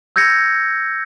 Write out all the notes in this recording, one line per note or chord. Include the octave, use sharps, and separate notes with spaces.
E6 G6 G#6 A#6 C#7